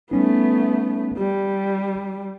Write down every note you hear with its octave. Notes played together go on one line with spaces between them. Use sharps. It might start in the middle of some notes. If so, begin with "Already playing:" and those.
G3 A3 B3 C#4 D#4
G3 G4